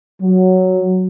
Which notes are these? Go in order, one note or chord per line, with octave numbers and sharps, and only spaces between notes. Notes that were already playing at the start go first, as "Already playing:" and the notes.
F#3